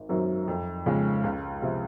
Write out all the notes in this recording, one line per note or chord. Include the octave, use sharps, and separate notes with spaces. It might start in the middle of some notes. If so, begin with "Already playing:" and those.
Already playing: G#1
F#2 D#3 F#3 C4
F2
C#3 F3 G#3
C#2
C3 F3